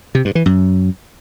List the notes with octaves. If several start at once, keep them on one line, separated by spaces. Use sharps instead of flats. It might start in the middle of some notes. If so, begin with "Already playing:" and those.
C3
G2
E3
F#2